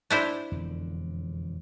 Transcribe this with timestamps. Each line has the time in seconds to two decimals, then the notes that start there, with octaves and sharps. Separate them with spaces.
0.10 D4 E4 C5
0.52 E1 F2 D3